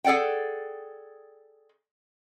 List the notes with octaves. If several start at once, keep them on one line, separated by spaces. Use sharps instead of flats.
G#4 A4 D5 F#5 G5